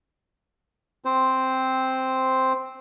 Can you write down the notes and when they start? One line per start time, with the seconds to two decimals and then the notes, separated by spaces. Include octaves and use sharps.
1.05 C4 C5